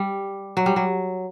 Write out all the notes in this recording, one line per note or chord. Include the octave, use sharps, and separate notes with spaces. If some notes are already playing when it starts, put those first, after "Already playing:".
Already playing: G3
F#3
G3
F#3